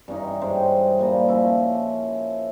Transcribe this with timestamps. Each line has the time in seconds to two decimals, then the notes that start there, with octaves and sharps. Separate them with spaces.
0.08 G2 E3 C#4 D#4
0.41 G2 G#3 C5 G5
0.99 A#2 G3 A#5
1.28 F3 C#4 E4